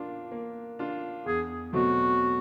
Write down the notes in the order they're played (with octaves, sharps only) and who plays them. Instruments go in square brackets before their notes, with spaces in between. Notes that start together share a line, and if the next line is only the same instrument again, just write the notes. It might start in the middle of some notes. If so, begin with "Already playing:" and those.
Already playing: [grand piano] A#3 D4 F4
A#3
D4 F4
[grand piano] E2 [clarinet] G#4
[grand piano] B2 F#3 A3 C4 [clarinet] F#4